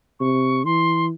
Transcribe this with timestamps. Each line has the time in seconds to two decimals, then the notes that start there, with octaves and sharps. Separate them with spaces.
0.20 C3 C#6
0.65 E3 C6